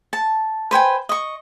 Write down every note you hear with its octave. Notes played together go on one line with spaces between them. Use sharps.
A5
B4 C5 G5 G#5
D#5 C#6